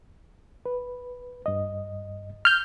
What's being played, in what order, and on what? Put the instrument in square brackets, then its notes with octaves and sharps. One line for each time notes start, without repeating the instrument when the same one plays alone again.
[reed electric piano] B4
G2 D#5
[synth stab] F6 G6